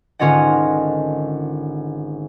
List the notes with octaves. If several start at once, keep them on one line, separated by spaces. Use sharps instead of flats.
G#1 D3 C#4 F4 D#5 F#5